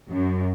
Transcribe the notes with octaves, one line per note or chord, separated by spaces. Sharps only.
F#2